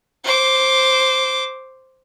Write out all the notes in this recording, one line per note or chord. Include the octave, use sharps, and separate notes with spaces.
C5 D6